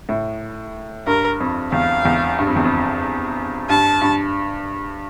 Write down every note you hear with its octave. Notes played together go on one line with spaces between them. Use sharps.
A2
G2 A#4
F2
E2 F5
E2
G2
F2
E2
F2
G2 A5
G2